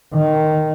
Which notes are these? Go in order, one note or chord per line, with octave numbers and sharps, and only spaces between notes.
D#3